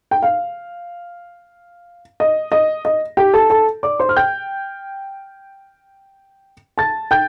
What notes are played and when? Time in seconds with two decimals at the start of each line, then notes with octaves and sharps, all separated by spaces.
0.11 G5
0.23 F5
2.20 D#5
2.52 D#5
2.85 D#5
3.17 G4 G5
3.33 A4 A5
3.50 A4 A5
3.83 D5 D6
4.00 C5 C6
4.09 F6
4.16 G5 G6
6.78 A5 A6
7.11 G5 G6